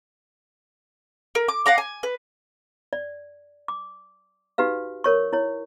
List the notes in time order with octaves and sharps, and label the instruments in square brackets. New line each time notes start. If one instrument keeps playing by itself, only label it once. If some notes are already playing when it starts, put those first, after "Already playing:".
[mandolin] A#4
D6
F5 F#5 A#5 D6
G#5
B4
[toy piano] D5
D6
D#4 F#4 G4 B4 F5
A#4 C#5 C#6
E4 C#5